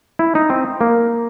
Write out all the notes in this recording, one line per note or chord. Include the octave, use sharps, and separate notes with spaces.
E4
D#4
C4
A#3